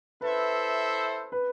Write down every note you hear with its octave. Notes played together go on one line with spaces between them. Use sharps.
E4 A4 B4 C5 E5
B4